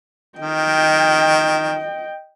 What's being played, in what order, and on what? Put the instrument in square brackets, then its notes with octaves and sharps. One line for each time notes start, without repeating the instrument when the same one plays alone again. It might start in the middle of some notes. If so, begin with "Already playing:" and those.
[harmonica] D#3 [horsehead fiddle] D#5 G5